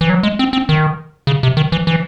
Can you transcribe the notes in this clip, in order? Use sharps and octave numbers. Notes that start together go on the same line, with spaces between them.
E3
F#3
G#3
C4
C4
D#3
C#3
C3
D#3
E3
E3